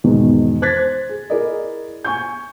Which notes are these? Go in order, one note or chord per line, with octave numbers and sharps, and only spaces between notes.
E2 G#2 B2 D#3
C5 F#6 G#6 A6 B6
G#4
E4 G#4 A#4 D5 D#5
G#5 C#6 G6